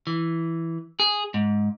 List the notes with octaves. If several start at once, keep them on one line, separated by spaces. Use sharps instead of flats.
E3
G#4
G#2